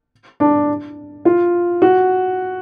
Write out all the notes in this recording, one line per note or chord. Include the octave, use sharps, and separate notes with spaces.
D4
F4
F#4